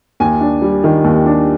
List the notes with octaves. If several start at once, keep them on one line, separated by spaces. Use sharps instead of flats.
D#2 G#5
D4
G3
D#3
D#2
D4